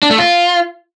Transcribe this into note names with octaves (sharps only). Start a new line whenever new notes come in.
D4
A3
F4